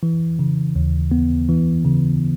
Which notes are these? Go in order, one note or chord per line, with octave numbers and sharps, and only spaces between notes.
E3
C#3
D#2
B3
E3
C#3